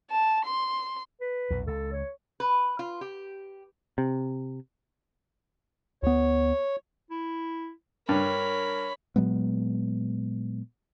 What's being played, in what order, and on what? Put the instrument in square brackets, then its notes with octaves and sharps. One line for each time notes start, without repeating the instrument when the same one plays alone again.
[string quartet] A5
C6
[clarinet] B4
[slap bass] B1 F2 A#2
[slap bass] C#2 [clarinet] A4
[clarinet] C#5
[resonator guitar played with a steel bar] B4
F4
G4
[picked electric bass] C3
[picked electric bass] D2 B3 [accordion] C#5
[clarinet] E4
[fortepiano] G2 [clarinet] A#4 [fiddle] C#5 B5
[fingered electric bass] A#2 F#3 G#3 B3